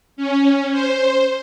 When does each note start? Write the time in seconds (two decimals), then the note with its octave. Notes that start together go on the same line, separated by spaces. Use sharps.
0.17 C#4
0.71 C5